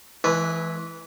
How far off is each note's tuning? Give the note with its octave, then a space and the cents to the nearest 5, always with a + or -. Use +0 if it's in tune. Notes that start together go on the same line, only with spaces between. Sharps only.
E3 +0 G#3 +45 B4 -5